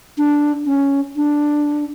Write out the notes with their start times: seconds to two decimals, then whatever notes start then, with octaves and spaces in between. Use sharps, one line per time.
0.18 D4
0.66 C#4
1.16 D4